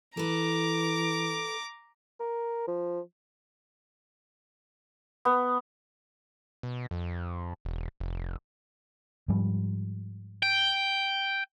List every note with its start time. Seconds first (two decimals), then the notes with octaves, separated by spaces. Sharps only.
0.17 E3 A4 B4 A#5 D6
2.20 A#4
2.68 F3
5.25 B3
6.63 B2
6.91 F2
7.65 E1
8.00 F1
9.28 G#2 F3 G3
10.43 G5